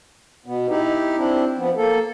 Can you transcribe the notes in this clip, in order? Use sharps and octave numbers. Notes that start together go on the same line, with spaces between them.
B2 B3
D#4 E4 G4
C4 D4 E4
F3 B3
A#3 A4